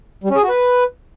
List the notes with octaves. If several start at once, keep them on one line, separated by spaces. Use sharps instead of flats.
G3
C#4
G#4
F#4
B4